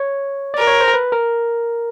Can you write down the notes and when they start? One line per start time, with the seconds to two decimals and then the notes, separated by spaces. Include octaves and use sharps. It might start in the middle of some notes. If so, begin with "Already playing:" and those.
Already playing: C#5
0.54 A#4 D5
0.67 C#5
0.81 C5
0.94 B4
1.12 A#4